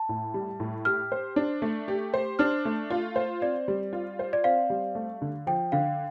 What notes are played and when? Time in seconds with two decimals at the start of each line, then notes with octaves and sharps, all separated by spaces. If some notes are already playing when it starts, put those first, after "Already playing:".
Already playing: A5
0.09 A2
0.34 G3
0.60 A2
0.85 G4 F6
1.12 C5
1.36 D4
1.62 A3
1.88 G4
2.14 C5
2.39 D4 F6
2.65 A3
2.90 F4
3.16 C5
3.42 C4 D5
3.68 G3
3.93 F4
4.19 C5
4.33 D5
4.44 C4 F5
4.70 G3
4.95 A3
5.22 D3
5.47 F3 G5
5.72 D3 F5